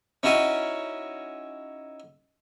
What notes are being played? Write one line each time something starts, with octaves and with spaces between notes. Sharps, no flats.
C#4 D#4 E4 F#4 G#5